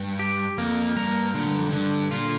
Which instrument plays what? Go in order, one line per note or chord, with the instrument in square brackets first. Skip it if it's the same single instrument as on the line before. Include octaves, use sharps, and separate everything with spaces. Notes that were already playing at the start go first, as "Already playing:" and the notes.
Already playing: [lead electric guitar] G2
[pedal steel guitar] G4
[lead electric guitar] F2 [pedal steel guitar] A#3
[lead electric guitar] G2 [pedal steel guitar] A#4
[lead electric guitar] A#2 [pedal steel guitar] D3
[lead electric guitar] G2
F2
[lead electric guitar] G2 [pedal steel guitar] D3
[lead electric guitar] A#2 [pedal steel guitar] F4